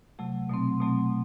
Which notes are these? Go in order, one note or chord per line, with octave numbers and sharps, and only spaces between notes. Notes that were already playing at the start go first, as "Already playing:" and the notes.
C3 F#3 A3
B2 F#3 A3 C4
B2 F#3 A3 C4